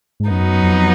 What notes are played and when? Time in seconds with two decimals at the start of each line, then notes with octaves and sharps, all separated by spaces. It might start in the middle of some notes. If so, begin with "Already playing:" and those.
0.20 G#2
0.30 F#2 F#3 B3 D#4
0.63 F2